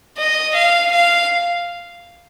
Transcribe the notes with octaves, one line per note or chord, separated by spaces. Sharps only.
D#5
F5
F5